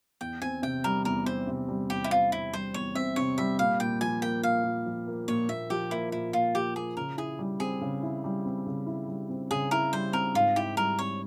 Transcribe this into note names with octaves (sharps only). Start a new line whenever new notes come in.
E2 G5
C4 G#5
C3 G5
G3 A#4
E2 A#4
C4 C5
C3
G3
E2 G4
E4
C4 F4
C3 E4
G3 C5
E2 C#5
C4 E5
C3 C#5
G3 E5
A#2 F5
A#2 G5
F3 G#5
A#3 G5
A#2 F5
A#2
F3
A#3
A#2 C#5
A#2 E5
F3 G4
A#3 E4
A#2 E4
A#2 F4
F3 G4
A#3 G#4
C#3 A#4
E4 G#4
G3
C4 G#4
C#3
E4
G3
C4
C#3
E4
G3
C4
C#3 G#4
E4 A#4
G3 C5
C4 A#4
G#2 F4
E4 G4
G3 A#4
C4 C#5